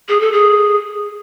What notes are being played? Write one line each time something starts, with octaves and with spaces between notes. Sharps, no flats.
G#4
A4
G#4